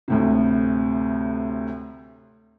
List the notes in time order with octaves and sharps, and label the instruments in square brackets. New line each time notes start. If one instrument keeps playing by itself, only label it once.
[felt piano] D2 A2 C3